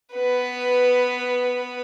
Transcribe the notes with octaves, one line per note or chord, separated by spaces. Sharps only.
B3 B4